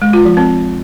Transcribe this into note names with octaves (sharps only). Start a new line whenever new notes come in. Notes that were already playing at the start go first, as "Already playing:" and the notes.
G#3
F4
F3
C4